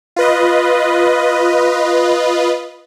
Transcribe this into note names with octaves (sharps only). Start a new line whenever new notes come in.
F4 B4 D#5